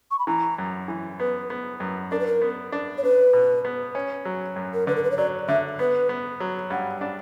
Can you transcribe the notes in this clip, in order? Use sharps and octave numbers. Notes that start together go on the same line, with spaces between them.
C#6
B5
E3 A#5
F#2
E3
B3 B4
B3
F#2
D4 A#4
B4
A#4
B3
D4
C#5
D4 B4
B2
B3
C#4
F#3
F#2
A#4
D3 B4
A#4
B4
C#5
F#3 D5
D3 E5
B3 B4
B3
F#3
G2 F#5
D4